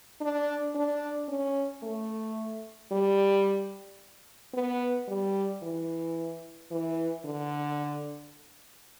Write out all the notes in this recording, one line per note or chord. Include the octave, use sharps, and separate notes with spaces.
D4
D4
C#4
A3
G3
B3
G3
E3
E3
D3